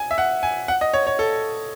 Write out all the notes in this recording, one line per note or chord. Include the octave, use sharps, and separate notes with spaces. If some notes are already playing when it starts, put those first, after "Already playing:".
Already playing: G#5
E5
F#5
G#5
F#5
D#5
C#5
C#5
A4